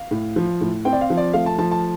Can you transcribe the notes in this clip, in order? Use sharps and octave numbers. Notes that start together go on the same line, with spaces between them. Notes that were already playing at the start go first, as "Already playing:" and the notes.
Already playing: F5
A2
F3
A2
C4 G5
D5
F5
F3
D5
A3 F5
A5
F3 A5
A5